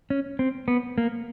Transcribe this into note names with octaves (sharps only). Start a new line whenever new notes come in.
C#4
C4
B3
A#3